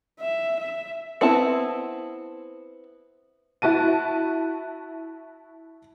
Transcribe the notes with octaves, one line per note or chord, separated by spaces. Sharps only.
E5
E5
B3 C4 E4 A5
E4 F#4 A5 D#7